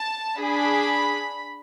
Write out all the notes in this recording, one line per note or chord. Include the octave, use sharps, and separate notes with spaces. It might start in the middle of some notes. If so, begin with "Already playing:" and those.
Already playing: A5
D4 G#4 B5